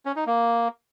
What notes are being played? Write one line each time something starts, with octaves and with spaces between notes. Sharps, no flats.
C#4
D#4
A#3